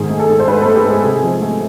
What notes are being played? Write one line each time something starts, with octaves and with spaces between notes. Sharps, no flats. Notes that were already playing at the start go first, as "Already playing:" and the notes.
Already playing: G#2 D#3 G#4
A3
A4
G#2
C5
G#2 B4
A3 A4
G4
G#2 G#4
C3
F3
A3